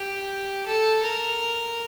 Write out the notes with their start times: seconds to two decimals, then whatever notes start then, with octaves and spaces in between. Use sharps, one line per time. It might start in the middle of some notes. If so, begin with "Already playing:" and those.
Already playing: G4
0.66 A4
1.03 A#4